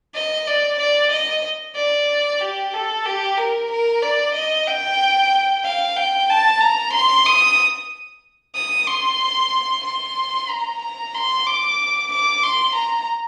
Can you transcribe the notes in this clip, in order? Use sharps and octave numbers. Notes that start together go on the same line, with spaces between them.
D#5
D5
D5
D#5
D5
G4
A4
G4
A#4
A#4
D5
D#5
G5
F5
G5
A5
A#5
C6
D#6
D#6
C6
C6
A#5
A#5
C6
D6
D6
C6
A#5